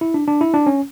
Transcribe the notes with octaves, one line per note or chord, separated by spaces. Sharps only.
E4
D4
D4
E4
D4
C#4